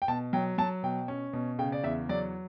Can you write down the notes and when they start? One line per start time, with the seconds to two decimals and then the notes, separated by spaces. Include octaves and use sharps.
0.02 G5
0.08 B2 A5
0.33 F#3 G5
0.58 F#3 A5
0.83 B2 G5
1.08 C#4
1.33 B2
1.59 C#3 G5
1.72 D5
1.84 E2 E5
2.09 F#3 D5